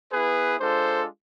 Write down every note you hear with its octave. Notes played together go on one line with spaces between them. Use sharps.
B3 E4 G#4 B4
G#3 D4 F4 A4 C5